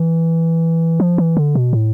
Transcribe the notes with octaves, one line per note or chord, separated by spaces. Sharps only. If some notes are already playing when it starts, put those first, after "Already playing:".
Already playing: E3
F3
E3
D3
B2
A2